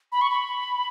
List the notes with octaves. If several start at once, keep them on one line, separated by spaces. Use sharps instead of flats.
B5
C#6
B5